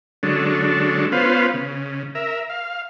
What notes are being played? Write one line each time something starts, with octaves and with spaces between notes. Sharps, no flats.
D3 F#3 G#3 C#4 D4 A4
B3 C#4 F4 B4 C5 F5
C#3
A#4 E5
F5